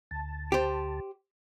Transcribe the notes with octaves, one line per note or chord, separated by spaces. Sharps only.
D2 A5
G4 C5